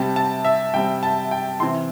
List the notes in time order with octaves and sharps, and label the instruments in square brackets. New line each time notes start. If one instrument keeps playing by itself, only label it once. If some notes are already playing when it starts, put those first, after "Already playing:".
Already playing: [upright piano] C3 G3 C4 A5
A5
E5
C3 G3 C4 G5
A5
G5
C3 E3 C4 C6